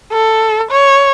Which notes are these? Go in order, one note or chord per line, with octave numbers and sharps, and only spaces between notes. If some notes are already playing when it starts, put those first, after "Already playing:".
A4
C#5